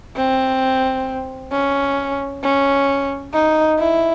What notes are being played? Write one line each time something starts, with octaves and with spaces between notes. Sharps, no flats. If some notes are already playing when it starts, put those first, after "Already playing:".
C4
C#4
C#4
D#4
E4